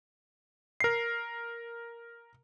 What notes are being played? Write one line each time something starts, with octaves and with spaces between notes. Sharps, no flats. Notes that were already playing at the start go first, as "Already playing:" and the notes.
A#4 C7